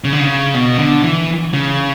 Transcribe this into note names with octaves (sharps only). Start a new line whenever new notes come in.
C#3
D3
C#3
B2
D3
E3
C#3